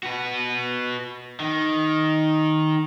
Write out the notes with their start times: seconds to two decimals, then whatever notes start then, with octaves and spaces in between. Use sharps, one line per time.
0.03 F#4 B4
1.40 D#3